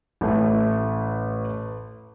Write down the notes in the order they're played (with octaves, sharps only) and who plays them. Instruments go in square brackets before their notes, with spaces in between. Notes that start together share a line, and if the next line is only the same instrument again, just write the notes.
[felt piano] A1 A3